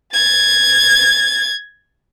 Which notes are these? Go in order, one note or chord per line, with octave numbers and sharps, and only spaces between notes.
G#6 A6